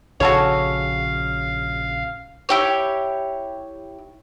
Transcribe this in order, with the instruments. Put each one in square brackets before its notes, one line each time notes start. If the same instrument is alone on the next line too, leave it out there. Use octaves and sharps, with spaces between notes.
[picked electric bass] A#1 C#3 [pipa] F#4 A4 C#5 [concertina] F5
[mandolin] E4 G4 C#5